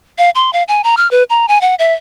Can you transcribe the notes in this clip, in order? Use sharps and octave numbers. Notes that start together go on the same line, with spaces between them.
F5
C6
F5
G#5
A#5
F6
B4
A#5
G#5
F#5
E5